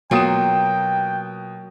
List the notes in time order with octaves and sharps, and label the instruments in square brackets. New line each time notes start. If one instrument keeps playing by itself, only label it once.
[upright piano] B2 D#6 E7 [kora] F#3 A#3 F4 [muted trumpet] G5